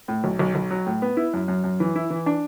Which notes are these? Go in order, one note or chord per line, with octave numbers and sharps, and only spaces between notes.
A2
B1
B1
B1
F#3
A2
B3
E4
F#2
F#2
F#2
E3
E4
E3
D4